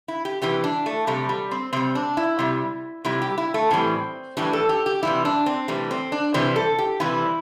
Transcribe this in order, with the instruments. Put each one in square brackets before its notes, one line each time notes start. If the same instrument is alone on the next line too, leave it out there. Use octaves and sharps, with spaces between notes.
[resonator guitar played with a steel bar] E4
G4
C3 E3 G3 G4
D4
A3
C3 G3 A3
G3
C4
C3 G3 C4
D4
E4
C3 G3
C3 G3 E4
G4
E4
A3
A2 E3 G3 C4
A2 E3 G3 D4
A4
G4
G4
C3 E3 G3 E4
D4
C4
C3 E3 G3 A3
C4
D4
C3 E3 G3 C5
A4
G4
C3 E3 G3 E4